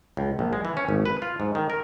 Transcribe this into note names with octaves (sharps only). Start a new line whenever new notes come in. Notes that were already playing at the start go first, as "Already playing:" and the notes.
C#2
A#1
G#3
E3
C#4
G#1
B4
F4
G#2
D#3
A#4